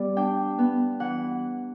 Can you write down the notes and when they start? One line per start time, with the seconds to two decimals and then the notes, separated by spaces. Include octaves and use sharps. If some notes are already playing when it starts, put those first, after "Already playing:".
Already playing: G3 B3 D5
0.16 D4 G5
0.59 B3
1.00 E3 F#5